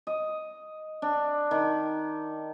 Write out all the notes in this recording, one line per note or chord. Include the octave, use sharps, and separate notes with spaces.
D#5
D4
D#3